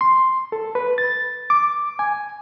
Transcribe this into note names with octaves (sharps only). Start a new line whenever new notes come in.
C6
A4
B4
A6
D6
G#5